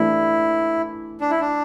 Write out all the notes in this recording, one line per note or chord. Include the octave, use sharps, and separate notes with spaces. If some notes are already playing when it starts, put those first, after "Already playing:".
Already playing: E3 A3 D4 E4 G4
D4
E4
D4